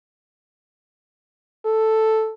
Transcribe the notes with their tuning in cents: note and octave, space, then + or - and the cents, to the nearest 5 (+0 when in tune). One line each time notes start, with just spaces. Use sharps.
A4 +0